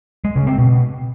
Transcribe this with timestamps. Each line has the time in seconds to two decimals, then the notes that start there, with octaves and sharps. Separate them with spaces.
0.25 G#3
0.36 C#3
0.47 C4
0.58 B2